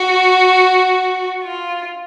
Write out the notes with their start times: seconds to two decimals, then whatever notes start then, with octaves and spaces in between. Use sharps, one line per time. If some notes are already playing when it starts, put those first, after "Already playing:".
Already playing: F#4
1.44 F4